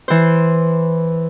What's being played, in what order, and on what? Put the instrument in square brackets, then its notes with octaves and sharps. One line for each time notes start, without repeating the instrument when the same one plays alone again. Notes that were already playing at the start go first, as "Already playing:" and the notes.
[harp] E3 C5